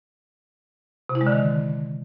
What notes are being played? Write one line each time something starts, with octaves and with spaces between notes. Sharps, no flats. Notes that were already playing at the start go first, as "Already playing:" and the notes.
C3
E4
G#3
D3
D#3